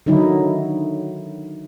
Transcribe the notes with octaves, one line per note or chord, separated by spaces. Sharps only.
D3 D#3 F#3 D#4 E4